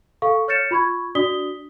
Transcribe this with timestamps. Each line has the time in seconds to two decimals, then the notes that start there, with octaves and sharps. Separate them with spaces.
0.22 A4 F5 C#6
0.48 C#5 F6 G6 A6 C#7 E7
0.71 F4 B5 C#6 G#6
1.15 D4 F#4 D5 D#6 B6 G7